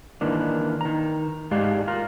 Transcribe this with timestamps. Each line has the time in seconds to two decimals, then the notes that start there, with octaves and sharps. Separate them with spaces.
0.21 D#3 E3 A#3 D4
0.81 D#3 A#5
1.51 G#2 G#3 G4 D5 F5
1.87 F4 A#4